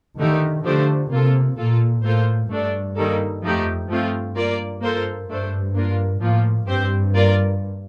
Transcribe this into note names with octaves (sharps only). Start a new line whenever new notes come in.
D3 D#3 A3 D#4 G4 A#4
D3 F3 A3 D4 G4 C5
C3 A#3 F4 A4
A#2 A#3 F4 A4
A2 A#3 F4 A4 C5
G2 A3 D4 A4 D5
D#3 G3 A#3 D#4 A4
F2 F3 A3 D#4 G4
G2 F3 A3 C4 F4
A#3 F4 A#4 D5
A#3 F4 A4 C5
G2 A3 D4 A4 C5
A#3 D4 F4 A#4
A2 F3 A#3 F4
G2 C4 G4 C5
A#3 F4 A#4 D5